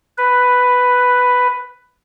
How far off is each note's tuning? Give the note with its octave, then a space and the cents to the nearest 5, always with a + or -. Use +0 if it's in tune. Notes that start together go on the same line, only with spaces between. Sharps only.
B4 +5